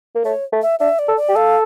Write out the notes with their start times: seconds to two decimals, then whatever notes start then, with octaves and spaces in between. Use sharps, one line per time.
0.15 A#3
0.24 A3 C#5
0.52 A3
0.62 E5
0.79 D4 E5
0.99 D5
1.08 A4
1.17 D5
1.29 G4
1.35 A4 F5